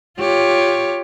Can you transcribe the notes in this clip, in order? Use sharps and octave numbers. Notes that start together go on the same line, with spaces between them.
F4 G4 C#5